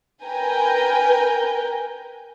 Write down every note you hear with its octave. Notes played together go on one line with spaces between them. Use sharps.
A#4 B4 G5 G#5 A#5